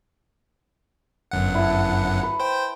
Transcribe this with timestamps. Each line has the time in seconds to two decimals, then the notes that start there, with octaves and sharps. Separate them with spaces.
1.31 G1 F#2 F#5
1.55 E4 A5
2.23 B4
2.40 C5 G5